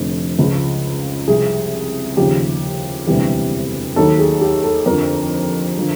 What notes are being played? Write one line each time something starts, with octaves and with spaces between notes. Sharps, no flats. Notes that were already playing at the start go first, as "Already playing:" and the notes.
Already playing: F1 F2 D3
C#2 C#3 F3
C2 C3 F3 G#4
D#2 C#3 F3 G4
E1 D2 C3 E3 G3
D#2 D#3 F#3 A4
G#4
G4
A4
F2 D3 F3 A#4
D3 F3